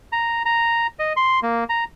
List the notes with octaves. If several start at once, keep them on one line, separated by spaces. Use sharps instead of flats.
A#5
A#5
D#5
C6
A#3
A#5